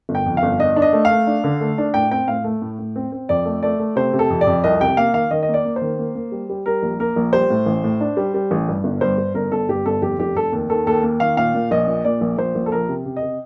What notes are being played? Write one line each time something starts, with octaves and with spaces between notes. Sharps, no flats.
G1
G5
F2
F5
G1
D4 D#5
D4
D#5
A3
F5
A3
D4
D3
A3
D4
A2 G5
C4 G5
A2 F5
A3
A2
A2
C4
C4
F2 D5
A3
A3 D5
A3
C3 C5
C3
A4
F2
D5
F2
C2 D#5
C3 G5
A#3 F5
D#3 F5
D#3 D#5
D#5
A#3
D5
A#3
C5
D#3
A#3
A#3
G3
G3
G3 A#4
A#1
A#3 A#4
A#1
G3 C5
A2
A1
A2
D4
G3
G3
A1
G2
G1
G2 C5
G2
G1 A#4
G1 A4
G2 G4
G1 A4
F1 G4
F1 G4
F1 A4
D#2
D#3 A4
D#2 A4
A#3
D#3 F5
A#2 F5
A#2
A#1 D#5
A#2
A#2 D5
A#1
A#1 C5
A#1
A4
F3 A#4
C3
C3
D#5
C3